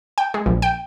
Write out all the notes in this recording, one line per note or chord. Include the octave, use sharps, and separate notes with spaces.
G5
G#3
A#1
G5